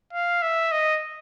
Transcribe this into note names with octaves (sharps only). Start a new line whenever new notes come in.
F5
E5
D#5